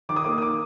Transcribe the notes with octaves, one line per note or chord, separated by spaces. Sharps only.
D#3 D6
D#6
A#3 D6
D#6
D6